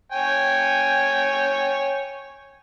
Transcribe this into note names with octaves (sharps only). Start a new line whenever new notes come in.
C#5 G5 G#5